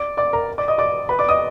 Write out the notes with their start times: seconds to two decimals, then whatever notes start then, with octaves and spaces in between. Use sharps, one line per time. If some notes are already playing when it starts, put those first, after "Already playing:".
Already playing: D5 D6
0.17 D5 D6
0.33 A#4 A#5
0.58 D5 D6
0.68 D#5 D#6
0.78 D5 D6
1.09 B4 B5
1.19 D5 D6
1.29 D#5 D#6